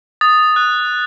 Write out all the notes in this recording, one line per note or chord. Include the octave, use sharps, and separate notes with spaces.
D#6 A6
F#6